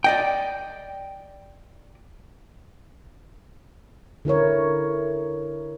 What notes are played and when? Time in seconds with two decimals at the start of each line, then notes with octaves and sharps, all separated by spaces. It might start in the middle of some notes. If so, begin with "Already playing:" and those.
0.04 D5 D#5 G5
4.25 D3 E4 A#4 C#5